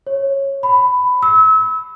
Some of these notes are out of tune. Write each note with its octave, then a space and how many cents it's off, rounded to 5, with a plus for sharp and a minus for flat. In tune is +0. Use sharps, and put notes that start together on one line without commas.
C#5 -15
B5 +15
E6 -30